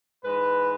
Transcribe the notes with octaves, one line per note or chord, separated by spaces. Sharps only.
G#2 E3 G#3 B4